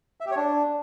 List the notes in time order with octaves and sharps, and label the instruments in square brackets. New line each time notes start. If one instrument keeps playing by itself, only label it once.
[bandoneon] E5
G4
C#5
D4